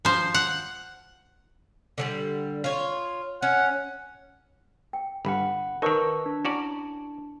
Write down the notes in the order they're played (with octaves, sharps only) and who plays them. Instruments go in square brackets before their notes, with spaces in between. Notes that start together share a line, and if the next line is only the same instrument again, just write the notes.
[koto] F3 C5
F#5
[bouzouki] D3 F3 G3
F4 C#5
[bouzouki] C#4 [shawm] F#5
[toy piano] G5
[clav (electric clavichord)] G1 G2 [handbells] F#5 B5
[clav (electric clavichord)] D#3 D#4 [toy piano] A#4 C#5 A5 [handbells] B4 C#6 E6
[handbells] D4
[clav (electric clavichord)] C#4 F#4 D5 [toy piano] E4